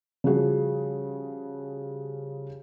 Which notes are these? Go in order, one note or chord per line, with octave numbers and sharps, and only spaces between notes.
C#3 F3 G3 F#4 G#4